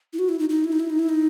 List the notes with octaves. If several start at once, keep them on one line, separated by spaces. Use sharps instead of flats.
E4
F#4
E4
D#4
D#4
E4
D#4
E4
D#4
E4
D#4